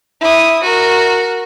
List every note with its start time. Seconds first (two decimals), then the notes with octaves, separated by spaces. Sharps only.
0.21 E4 D#6
0.62 F#4 A#4